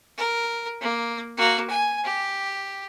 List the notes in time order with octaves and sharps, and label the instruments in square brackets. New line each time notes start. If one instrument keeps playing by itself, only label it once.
[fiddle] A#4
A#3
A#3 F#4
G#5
G4